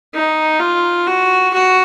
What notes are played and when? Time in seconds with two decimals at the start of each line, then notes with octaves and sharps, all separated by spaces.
0.14 D#4
0.60 F4
1.07 F#4
1.53 F#4